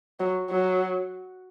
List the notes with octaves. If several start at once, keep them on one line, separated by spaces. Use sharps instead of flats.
F#3
F#3